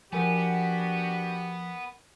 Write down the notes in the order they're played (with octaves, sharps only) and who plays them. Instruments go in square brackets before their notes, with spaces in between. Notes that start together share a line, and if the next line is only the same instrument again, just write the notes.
[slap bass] F3 [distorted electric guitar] B3 [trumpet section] D4 F#4 G4 [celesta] A#4 G#5